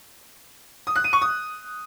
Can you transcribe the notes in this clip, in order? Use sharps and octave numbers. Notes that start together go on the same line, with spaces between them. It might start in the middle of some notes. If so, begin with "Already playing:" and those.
D#6
F#6
D#7
C#6
D#6